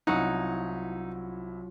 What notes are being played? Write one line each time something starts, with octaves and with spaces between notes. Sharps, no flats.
C2 F3 F#3 C#4 D#4 E4 F#5